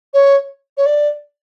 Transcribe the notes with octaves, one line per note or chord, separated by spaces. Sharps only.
C#5
C#5
D5